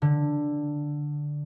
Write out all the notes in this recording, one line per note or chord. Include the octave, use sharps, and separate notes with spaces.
D3